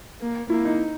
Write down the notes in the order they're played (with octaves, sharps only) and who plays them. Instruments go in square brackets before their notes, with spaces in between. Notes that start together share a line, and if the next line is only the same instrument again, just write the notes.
[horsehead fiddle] A#3
[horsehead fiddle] A#3 [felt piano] E4
[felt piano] D#4